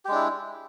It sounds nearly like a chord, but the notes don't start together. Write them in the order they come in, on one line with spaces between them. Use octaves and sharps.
G4 G#3 D4 E4